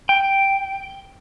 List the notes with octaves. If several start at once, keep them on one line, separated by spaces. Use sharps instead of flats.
G5